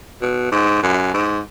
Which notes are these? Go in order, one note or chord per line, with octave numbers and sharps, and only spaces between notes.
B2
G#2
F#2
G#2